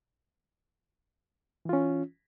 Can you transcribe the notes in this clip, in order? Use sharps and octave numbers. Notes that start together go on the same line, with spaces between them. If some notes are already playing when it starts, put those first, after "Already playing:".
E3 C#4 F4